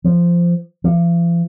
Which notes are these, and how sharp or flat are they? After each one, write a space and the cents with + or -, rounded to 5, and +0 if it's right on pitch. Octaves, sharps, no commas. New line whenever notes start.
F3 -15
F3 -45